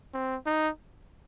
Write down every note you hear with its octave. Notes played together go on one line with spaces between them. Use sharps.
C4
D#4